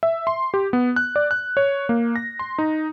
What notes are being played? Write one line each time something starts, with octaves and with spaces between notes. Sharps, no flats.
E5
C6
G4
B3
F#6
D5
F#6
C#5
A#3
A#6
C6
D#4